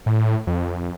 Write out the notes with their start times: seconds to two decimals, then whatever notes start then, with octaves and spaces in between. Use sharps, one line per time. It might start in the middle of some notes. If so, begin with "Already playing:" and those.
0.06 A2
0.47 F2